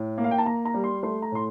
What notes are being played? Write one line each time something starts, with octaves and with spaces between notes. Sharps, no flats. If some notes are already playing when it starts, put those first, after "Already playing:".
Already playing: A2
A#3
F5
G5
A5
A#3 A#5
A#5
G3
C6
A3 C6
A#5
A2 C6